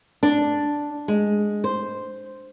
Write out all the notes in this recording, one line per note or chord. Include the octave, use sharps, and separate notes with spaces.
D4
G#3
C5